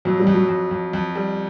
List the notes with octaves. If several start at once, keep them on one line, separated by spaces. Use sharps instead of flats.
F2 F#3
G3
F2
F#3
F2
F2
F2
G3